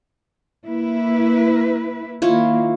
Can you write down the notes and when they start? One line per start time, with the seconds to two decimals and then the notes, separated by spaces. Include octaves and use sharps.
0.66 A#3 E4 B4
2.22 D#3 A#3 E4 F4 C#5